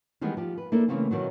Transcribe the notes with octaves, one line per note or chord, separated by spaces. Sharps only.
D#3 E3 G3 G#3 B3
F3 G4
B4
A#3 D4 E4 A4 A#4
C#3 E3 A3 A#3 C4
B2 D#3 E3 F#3